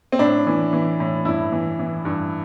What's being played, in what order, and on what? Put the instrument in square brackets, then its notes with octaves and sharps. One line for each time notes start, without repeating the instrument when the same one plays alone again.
[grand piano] C4
A2 D4
E3
E3
A2
G2 E4
E3
E3
G2